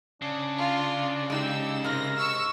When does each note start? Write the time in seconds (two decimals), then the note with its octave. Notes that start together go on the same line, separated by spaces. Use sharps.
0.22 C#3 D4
0.57 F4
1.30 G#3 D#4 G4 E6
1.84 G#2 C3 G#3 A#4 A#6
2.16 C#6 E6